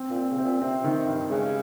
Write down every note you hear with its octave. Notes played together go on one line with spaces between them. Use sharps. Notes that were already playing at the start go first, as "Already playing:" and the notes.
Already playing: C4
A#2
C4
C#3
C3 C4
A#2
C3 C4
D#3
G2
C#3 G#3